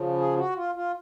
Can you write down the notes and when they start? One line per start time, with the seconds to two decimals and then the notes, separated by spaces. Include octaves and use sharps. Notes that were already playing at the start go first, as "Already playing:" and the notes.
Already playing: C#3 F3
0.18 G#4
0.37 F#4
0.55 F4
0.75 F4